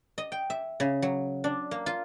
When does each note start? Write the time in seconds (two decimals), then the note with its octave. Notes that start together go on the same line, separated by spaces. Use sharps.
0.18 D#5
0.32 G5
0.50 E5
0.80 C#3
1.02 F#3
1.44 D4
1.71 A#3
1.86 F4